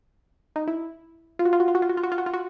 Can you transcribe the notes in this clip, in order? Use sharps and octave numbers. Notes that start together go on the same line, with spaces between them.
D#4
E4
F4
F#4
F4
F#4
F4
F#4
F4
F#4
F4
F#4
F4
F#4
F4
F#4